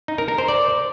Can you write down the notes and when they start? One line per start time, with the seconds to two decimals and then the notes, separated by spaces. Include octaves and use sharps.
0.08 D#4
0.18 A#4
0.28 A#4
0.38 C5
0.48 D5